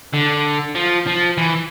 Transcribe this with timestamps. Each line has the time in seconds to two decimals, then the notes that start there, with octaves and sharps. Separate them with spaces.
0.14 D3
0.75 F3
1.07 F3
1.38 E3